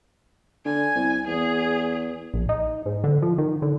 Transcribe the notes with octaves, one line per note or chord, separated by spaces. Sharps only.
D3 G#5
C2
E2 G#4
A#1
D#4
G#2
D3
F3
D#3
D3